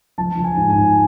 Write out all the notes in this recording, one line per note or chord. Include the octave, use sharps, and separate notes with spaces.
F3 A5
F3
G#5
G#2
G#5
G#2